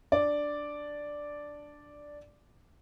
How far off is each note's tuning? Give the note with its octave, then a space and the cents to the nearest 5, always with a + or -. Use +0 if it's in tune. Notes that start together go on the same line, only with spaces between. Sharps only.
D4 +0 D5 +0